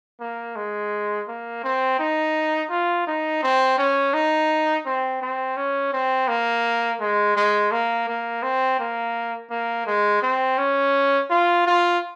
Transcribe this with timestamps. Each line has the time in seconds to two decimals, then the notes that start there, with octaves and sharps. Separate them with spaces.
0.20 A#3
0.56 G#3
1.28 A#3
1.64 C4
1.99 D#4
2.70 F4
3.07 D#4
3.43 C4
3.78 C#4
4.14 D#4
4.86 C4
5.22 C4
5.57 C#4
5.93 C4
6.28 A#3
7.00 G#3
7.36 G#3
7.72 A#3
8.08 A#3
8.43 C4
8.79 A#3
9.51 A#3
9.87 G#3
10.23 C4
10.58 C#4
11.30 F4
11.66 F4